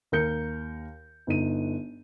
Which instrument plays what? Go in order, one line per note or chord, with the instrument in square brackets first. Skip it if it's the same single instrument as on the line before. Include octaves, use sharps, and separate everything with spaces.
[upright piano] D#2 A#4 G6 C#7
G1 D#4 D#7